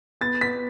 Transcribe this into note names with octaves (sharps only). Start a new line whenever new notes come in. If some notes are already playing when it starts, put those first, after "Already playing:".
B3 A6
B3 B6